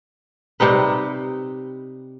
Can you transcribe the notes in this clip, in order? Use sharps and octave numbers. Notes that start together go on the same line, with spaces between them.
C3 G3 D#4 B4